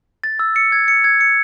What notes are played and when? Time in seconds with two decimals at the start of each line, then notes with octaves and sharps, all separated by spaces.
0.24 A6
0.39 E6
0.56 C#7
0.72 G#6
0.88 C#7
1.04 G#6
1.21 C#7